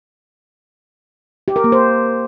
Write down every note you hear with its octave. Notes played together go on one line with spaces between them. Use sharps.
G4
A#4
A#3
C5